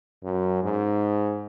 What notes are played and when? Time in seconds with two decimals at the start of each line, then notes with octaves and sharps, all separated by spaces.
0.24 F#2
0.63 G#2